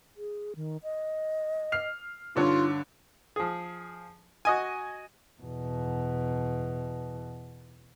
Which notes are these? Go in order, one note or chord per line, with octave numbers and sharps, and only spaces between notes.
G#4
D#3
D#5
F6 C7 F7
G2 D3 D#4 F4 C#5
F3 G#4
F#4 D#5 G#5
E2 B2